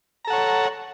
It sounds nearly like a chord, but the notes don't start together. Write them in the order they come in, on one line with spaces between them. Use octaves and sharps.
A#5 A4 F#5 C#5